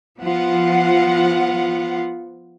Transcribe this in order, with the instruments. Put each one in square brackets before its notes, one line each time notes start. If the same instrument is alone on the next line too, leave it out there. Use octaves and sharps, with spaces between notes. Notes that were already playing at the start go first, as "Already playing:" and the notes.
[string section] F3 F#5 [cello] B3 F4